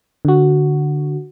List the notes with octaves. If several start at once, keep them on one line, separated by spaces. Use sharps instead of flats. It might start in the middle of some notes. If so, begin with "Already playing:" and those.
D3 F#4